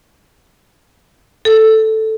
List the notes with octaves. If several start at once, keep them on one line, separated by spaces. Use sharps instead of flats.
A4